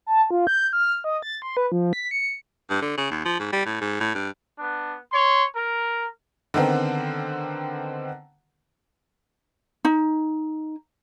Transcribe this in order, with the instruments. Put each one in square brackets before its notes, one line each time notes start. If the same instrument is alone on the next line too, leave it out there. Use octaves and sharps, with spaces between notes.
[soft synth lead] A5
F4
G6
F6
D#5
A6
C6
B4
F3
B6
C#7
[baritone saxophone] G2
D3
C#3
D#2
F3
G#2
G3
A2
G#2
A2
G2
[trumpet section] B3 D4
C#5 C6
A#4
[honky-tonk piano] D3 D#3 B3 C4
[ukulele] D#4